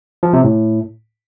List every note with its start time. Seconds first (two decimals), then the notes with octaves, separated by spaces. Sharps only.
0.23 F3
0.33 C3
0.44 A2